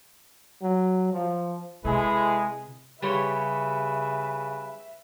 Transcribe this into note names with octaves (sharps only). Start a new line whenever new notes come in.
F#3
F3
C3 G#3 E4 G#4 A4 B4
C#3 G3 G4 B4 C#5 E5